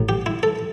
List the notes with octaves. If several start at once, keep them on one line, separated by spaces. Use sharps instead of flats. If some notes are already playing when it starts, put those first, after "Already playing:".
Already playing: A1 A2
G4
E4
A4